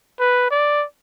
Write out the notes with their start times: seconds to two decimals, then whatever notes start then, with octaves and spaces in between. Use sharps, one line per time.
0.20 B4
0.51 D5